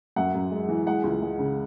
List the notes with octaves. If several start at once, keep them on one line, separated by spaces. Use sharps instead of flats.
F#2 F#5
F#2
G#3
E3
G#3 F#5
C#2
G#3
C#3